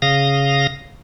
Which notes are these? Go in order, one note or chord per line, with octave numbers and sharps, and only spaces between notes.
C#3 F5 D#6 A#6